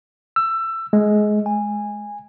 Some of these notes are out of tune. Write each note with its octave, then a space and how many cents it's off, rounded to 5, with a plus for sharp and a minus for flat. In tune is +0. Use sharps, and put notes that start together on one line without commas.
E6 +20
G#3 +20
G#5 -15